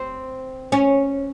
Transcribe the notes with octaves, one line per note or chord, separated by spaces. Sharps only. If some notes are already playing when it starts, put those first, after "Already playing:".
Already playing: C4
C#4